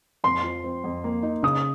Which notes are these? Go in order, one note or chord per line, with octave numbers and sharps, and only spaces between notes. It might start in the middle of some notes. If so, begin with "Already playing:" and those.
F2 C6
F3
C4
F2
A#3
D#4
C#3 D#6